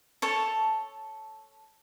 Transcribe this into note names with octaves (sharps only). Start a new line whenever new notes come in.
A4 C#5 A5